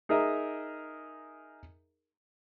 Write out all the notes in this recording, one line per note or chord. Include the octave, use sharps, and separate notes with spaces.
D#4 G#4 A#4 D#5 E5